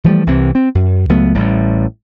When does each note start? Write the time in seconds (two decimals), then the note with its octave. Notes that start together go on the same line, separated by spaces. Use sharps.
0.04 E3 F3 G3 A3
0.27 C2 C3 E3 C4
0.55 C4
0.75 F#2
1.09 C#2 F#3 A3 B3
1.35 A1 A2 G3